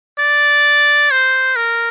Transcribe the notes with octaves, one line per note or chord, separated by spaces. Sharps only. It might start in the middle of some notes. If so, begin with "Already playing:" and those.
D5
C5
A#4